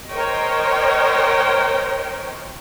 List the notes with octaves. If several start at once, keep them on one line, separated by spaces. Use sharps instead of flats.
A#4 C5 C#5 D#5 G5